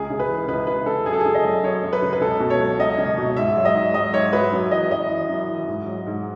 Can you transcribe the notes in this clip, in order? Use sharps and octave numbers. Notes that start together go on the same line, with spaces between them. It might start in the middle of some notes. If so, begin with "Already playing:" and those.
Already playing: C#2 G#4
C#3
B4
E3
C#2 B4
C#2 B4
C#3 A4
F#2 G#4
A4
C#3 G#4
D#5
F#3
F#2 C#5
F#2
B4
C#3
B4
C#2 A4
B2
C#5
F#3
C#2 D#5
C#2
B2
G#2 E5
F#3
D#5
G#2
F#3 D#5
G#2 C#5
F#3 B4
F#2
E3 D#5
F#2 D#5
E3
F#2
E3
G#2
F#3
G#2